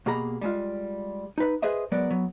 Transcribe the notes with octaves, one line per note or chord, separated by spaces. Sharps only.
B2 A#3 G4 G#4 A#5 B5
G3 G#3 F4
D#4 B4
G#4 B4 C5 D#5 E5
F#3 G#3 B3 A#4 D5
F#3 B3